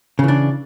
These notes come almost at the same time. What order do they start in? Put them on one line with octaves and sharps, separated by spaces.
C#3 E3 D4